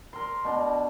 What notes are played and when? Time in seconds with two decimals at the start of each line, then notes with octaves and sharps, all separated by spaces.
0.13 A#4 C6
0.45 B2 D4